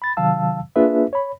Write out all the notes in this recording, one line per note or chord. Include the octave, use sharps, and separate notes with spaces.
B5 A6
C3 D#3 F#3 F5 A5 E6
A#3 D4 F4 G#4 B4 E5
C#5 B5